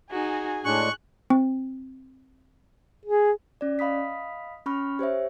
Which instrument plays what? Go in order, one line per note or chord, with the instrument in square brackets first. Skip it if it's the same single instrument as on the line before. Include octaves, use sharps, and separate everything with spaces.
[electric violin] D#4 F#4 [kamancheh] G#4 G#5
[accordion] A2 G#3 D4 [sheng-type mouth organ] C#6 [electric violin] F#6
[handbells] C4
[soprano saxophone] G#4
[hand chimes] C#4 D5
D#5 F5 B5 D#6 B6
C#4 B5 C#6 F6
G4 C5 C#5 E5